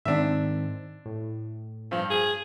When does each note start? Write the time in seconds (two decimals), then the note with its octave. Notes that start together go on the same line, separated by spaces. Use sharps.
0.05 G#2 D#3 C4 D4 E5
1.06 A2
1.91 G2 F3
2.10 G#4